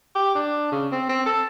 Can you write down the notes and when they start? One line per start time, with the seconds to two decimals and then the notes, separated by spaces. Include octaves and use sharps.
0.15 G4
0.35 D4
0.72 C#3
0.92 C4
1.09 C4
1.26 A4